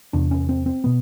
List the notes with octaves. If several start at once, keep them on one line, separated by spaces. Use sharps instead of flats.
E2 C3 D4
C#4
C4
C4
B2 B3